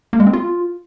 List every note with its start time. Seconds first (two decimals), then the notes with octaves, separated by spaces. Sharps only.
0.13 A#3
0.20 G#3
0.27 C4
0.33 F4